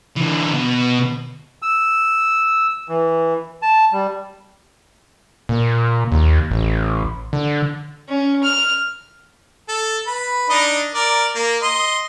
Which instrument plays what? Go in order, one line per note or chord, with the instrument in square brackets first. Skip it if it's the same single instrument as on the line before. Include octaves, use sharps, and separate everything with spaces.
[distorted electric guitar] D3 E3
B2
[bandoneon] E6
E3
A5
G3
[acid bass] A#2
D#2
A1
D3
[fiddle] C#4
F6
[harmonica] A4
B4
D4 D#4 D#5
A#4 D5
A#3
D#5 C6